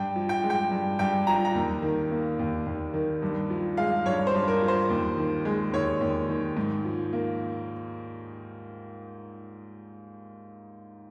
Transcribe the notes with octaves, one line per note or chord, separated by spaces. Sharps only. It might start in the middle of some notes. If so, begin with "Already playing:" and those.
Already playing: G2 G5
F3
G5
G#3
G5
G2
G2 G5
F3 A#5
A#5
D#2
D#3
A#3
D#2
D#2
D#3
G2
F3
G#3 F5
G2 C#5
C5
G2
A#4
F3
C5
D#2
D#3
G#3
D#2 C#5
D#2
D#3
G#2
F3
A#3